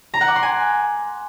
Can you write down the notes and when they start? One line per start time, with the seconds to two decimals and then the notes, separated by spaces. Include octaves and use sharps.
0.14 A#5
0.21 F#5
0.28 D6
0.35 C6
0.43 G#5